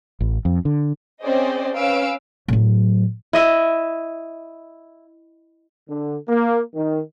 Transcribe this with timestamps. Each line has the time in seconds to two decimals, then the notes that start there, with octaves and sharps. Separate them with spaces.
0.20 A1
0.45 F2
0.65 D3
1.23 C4 C#4 G#4 C5 D5 D#5
1.76 C#4 B4 F5 E6 D7
2.48 A2 F#3
3.33 E4 D#5 E5
5.89 D3
6.29 A#3
6.74 D#3